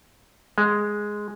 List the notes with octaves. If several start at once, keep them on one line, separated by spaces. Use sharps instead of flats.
G#3